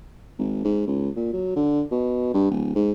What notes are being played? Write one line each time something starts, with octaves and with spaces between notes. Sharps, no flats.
G#1
G#2
C#2
A#2
F#3
D3
B2
G2
D1
G#2